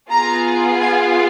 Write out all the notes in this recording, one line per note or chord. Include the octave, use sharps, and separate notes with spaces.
B3 F4 G#4 A#5
G#5